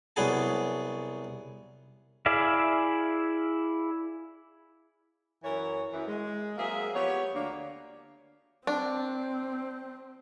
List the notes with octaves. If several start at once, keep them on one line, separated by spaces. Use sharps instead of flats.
C2 F#3 B3 G#4 A5
E4 G#4 D5 E5 F5
F#2 E3 A#4 C#5
F#2 E3
G#3
F#3 A#3 C4 G#4 E5 F5
F3 B3 G4 C#5
D2 A#3 D4
C4 D4